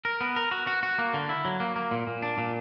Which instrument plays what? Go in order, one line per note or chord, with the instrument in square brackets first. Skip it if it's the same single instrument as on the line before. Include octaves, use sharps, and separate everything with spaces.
[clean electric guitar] A#4
B3
A#4
F#4
F#4
F#4
A#3
D3
E4
F#3
A#3
A#3
A#2
A#2
D4
A#2